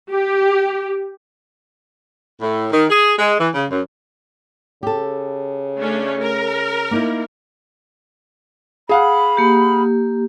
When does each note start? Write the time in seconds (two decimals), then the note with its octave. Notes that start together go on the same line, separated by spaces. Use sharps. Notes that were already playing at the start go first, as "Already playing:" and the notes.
0.11 G4
2.41 A2
2.72 D#3
2.90 G#4
3.19 G#3
3.39 E3
3.54 C#3
3.71 F#2
4.83 C#3 G4 A4
5.77 A3 C#4 D4
6.20 A#4
6.91 A#3 D#4 E4
8.89 G#4 F5 F#5 B5
9.37 A#3 G4